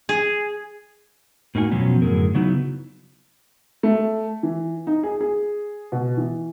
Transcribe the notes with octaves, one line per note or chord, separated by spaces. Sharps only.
G#4
A2 A#3 D#4 F#4 G#5
F2 B2 F3 F#3 B3 C#4
F#2 A2 D3 G#4 A#4
C#3 F#3 B3 D#4 E4 F#4
A3
E3
D#4
G#4
G#4
B2
E3